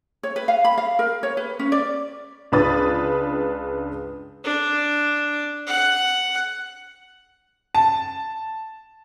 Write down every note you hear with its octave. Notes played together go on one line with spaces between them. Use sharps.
C#5
B4
F5
B5
F5
A#4
C#5
B4
C#4
D5
C#2 D4 B4 D#6 A6
D4
F#5
A5